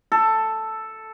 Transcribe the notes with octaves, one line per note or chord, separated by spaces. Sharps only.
A4